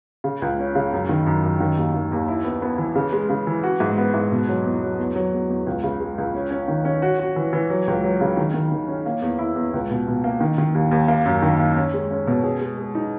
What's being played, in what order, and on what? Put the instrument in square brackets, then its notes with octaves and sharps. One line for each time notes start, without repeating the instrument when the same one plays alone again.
[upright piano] C#3
C#2
C#4
C#3
F#2
D#3
F#2
F#2
D#3
D#2
D#3
D#2
E4
B3
B3
E3
C#3
G#3
C#3
E3
F#4
G#2
B3
G#2
B2
F#3
E2
F#3
E2
F#3
E2
E2
C#2
C#3
G#3
C#2
C#4
C#4
D#3
C#4
F#4
F#4
E3
E3
F#3
C#2
F#3
C#3
D#3
D#3
D#3
C#4
A#3
E2
E4
E2
C#2
B2
B2
A#3
D#3
D#3
D#2
D#2
A#3
F#2
D#3
A#3
C#4
G#3
C#4
B2
G#4
G#3
G#3
D#4